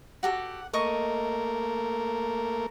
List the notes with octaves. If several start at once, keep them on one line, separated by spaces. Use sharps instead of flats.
F#4 G4 A4 F#5
A3 A#3 A#4 D#5 C#6